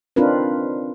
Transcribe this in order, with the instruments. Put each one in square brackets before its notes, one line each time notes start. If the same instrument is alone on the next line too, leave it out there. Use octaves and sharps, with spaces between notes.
[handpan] C4 D4 D#4 F4 A#4 B4